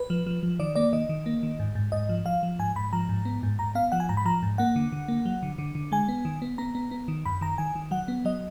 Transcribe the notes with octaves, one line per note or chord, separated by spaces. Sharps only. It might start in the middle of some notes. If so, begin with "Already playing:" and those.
Already playing: B4
F3
F3
F3
D#3 D5
A#3 D5
D#3 D#5
D#3
A#3
D#3
G#2
G#2
G#2 D#5
F3
F3 F5
F3
G#2 G#5
G#2 B5
F3 A#5
G#2
B3
G#2
G#2 A#5
B3 F5
F3 F#5
G#5
G#2 A#5
B5
F3 A#5
G#2
A#3 F#5
D3
D3
A#3
F#3
D3
D3
D3
G#3 G#5
B3
D#3
B3
B3 A#5
B3
B3
D#3
F#2 B5
D#3 A#5
D#3 G#5
D#3
F#3 F#5
B3
F#3 D#5